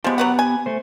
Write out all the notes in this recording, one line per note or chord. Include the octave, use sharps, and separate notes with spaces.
F3 G#3 B3 G4
F#3 B4 F#5
G#5
A3 C5